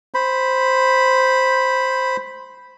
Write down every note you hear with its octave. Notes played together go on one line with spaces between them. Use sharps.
C5 B5